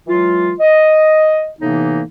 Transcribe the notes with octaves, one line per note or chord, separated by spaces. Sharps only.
E3 F#3 G#3 F4
D#5
A2 C3 E3 A#3 B3 D#4